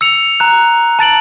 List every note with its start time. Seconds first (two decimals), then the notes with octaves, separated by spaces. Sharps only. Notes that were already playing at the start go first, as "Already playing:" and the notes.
0.01 E6 C#7 F7
0.40 A#5 F#6
0.99 A5 A6 D7 F#7